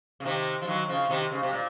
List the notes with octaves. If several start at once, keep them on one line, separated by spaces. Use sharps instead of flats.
C#3
C3 D#3
F3
D#3 F#3
C#3 F3
C3 D#3
C#3
C3
A#2